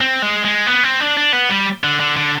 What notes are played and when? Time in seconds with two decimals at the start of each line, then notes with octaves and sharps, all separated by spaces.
0.01 C4
0.22 G#3
0.45 G#3
0.67 B3
0.84 C4
1.00 D4
1.17 D4
1.33 B3
1.49 G3
1.84 D3
2.00 D3
2.17 D3